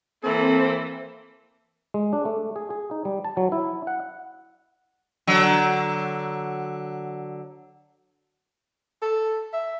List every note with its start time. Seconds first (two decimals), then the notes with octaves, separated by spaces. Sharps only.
0.23 E3 A#3 C4 A4
1.94 G#3
2.13 D4
2.25 A3
2.56 G#4
2.70 G#4
2.91 D#4
3.05 G3
3.25 A5
3.37 F#3
3.52 E4
3.87 F#5
5.27 D3 F#3
9.02 A4
9.53 E5